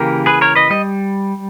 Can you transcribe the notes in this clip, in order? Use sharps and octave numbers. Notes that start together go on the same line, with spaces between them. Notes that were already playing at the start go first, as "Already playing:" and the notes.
Already playing: C#3 E3 A#3 G4 A#4
G#4 B4
A#4 C#5
B4 D#5
G3 D#5